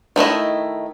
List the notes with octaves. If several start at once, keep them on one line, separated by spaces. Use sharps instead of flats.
D#3 A3 E4 D#5